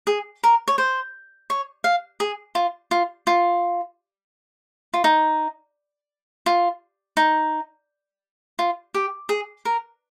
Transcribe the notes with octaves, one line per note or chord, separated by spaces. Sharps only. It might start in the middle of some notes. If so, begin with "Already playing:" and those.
G#4
A#4
C#5
C5
C#5
F5
G#4
F4
F4
F4
F4
D#4
F4
D#4
F4
G4
G#4
A#4